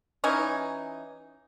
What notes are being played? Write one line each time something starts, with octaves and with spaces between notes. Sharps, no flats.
E3 C#4 D#4 G#5